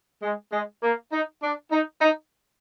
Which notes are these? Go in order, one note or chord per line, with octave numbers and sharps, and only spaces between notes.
G#3
G#3
A#3
D#4
D4
D#4
D#4